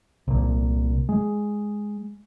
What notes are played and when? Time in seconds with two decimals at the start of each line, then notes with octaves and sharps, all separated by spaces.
0.28 C2 A#2
1.09 G#3